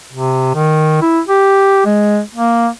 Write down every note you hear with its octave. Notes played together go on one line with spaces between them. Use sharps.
C3
D#3
E4
G4
G#3
A#3